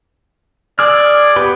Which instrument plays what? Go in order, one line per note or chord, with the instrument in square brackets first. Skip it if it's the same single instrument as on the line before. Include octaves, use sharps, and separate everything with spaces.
[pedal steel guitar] G#4 E6 F6 [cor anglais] D5
[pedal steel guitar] B3 G4 B4